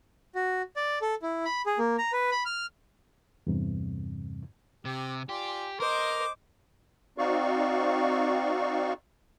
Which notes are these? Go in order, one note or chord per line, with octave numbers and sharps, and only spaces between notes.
F#4
D5
A4
E4
B5
G#4
A#3
A#5
B4
B5
F6
E2 G2 C3
C3 G4
F4 G4 D5 G#5
A#4 C5 D#5 D6
C4 D#4 F#4 D5 F5 C#6